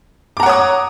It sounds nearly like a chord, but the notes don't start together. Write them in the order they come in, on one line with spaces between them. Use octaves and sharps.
D6 A#5 F#5 C#5 D#6